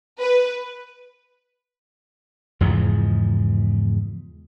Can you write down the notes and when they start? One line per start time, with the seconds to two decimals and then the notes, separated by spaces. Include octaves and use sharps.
0.20 B4
2.61 E2 G#2 C#3 F3